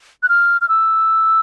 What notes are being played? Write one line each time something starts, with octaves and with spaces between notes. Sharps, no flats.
F#6
F6
F6
E6